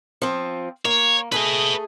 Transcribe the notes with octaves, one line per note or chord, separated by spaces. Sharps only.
F3 C4
A#3 C#5
A3 G#4 B4 D#5